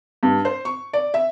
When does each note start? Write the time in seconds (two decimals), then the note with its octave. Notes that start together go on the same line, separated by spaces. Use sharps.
0.23 G2
0.45 C5
0.65 C#6
0.93 D5
1.14 E5